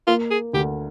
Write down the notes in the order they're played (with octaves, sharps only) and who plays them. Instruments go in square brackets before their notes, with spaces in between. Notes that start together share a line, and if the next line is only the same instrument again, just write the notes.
[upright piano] A#3 [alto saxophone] F4
[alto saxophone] G#4
[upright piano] D2 [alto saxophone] G4